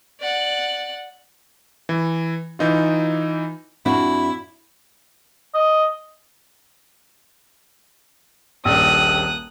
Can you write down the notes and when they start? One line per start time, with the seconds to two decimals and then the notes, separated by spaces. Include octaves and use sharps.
0.21 D5 F#5
1.89 E3
2.59 E3 D#4 F4
3.86 F2 D4 E4 F#4
5.54 D#5
8.65 D#1 A#1 D#6 F#6